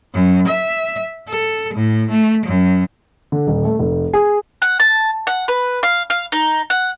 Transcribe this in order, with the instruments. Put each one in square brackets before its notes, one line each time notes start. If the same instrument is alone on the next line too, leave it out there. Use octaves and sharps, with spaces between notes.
[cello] F#2
E5
A4
A2
A3
F#2
[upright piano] D3
D#1
A3
F1
G#4
[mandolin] F#5
A5
F#5
B4
F5
F5
D#4
F#5